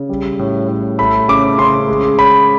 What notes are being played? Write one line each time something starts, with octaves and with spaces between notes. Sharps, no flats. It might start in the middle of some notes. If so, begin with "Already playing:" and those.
Already playing: C#3
G3
A2
A2
A3 B5
C#3 D6
C#3 C6
G#3
C#4 B5